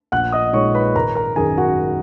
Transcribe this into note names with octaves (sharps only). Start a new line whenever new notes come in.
A#1 F#5 F#6
D#5 D#6
A#2 G#3 D#4 C#5 C#6
B4 B5
G#1 A#4 A#5
A#4 A#5
F#2 D#3 G#4 G#5
F#4 F#5